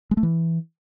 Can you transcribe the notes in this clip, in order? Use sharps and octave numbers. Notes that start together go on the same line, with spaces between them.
G#3
A3
E3